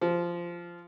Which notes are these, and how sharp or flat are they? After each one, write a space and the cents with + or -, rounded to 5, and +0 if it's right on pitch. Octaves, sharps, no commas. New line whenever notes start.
F3 -10